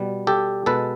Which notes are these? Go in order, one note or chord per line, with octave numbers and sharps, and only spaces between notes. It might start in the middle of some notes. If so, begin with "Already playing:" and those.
Already playing: B2 G3
G4 A4
B2 G#3 A4 B4